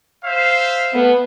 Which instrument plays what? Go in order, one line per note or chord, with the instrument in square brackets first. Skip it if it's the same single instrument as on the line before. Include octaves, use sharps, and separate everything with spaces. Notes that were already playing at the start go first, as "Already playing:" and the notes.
[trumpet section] C5 E5 F5
[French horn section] A3 B3